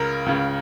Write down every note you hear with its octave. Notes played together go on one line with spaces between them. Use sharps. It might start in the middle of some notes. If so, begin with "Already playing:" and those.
Already playing: C#2 C#3 A#4
C#2 C#3